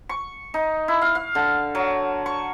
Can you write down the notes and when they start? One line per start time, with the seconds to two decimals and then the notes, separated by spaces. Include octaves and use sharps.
0.09 C#6
0.54 D#4
0.88 E4
1.02 F5
1.15 F5
1.35 D3
1.75 F#3
2.26 C#6